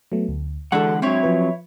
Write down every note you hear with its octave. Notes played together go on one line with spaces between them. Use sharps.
F#3 A3 B3
D2
D3 E3 G#3 D4 F#4 A4 F#5
F#3 C4 E4 C#5
F3 B4